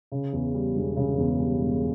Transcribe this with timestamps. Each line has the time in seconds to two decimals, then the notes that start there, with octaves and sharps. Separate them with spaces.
0.12 C#3
0.33 E2
0.54 G3
0.76 E1
0.96 C#3
1.18 E2
1.40 G3
1.61 E1